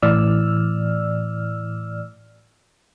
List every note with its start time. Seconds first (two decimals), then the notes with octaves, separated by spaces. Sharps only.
0.02 A2 E3 D5 E6 F6